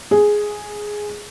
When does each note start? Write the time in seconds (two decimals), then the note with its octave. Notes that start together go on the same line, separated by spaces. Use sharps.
0.11 G#4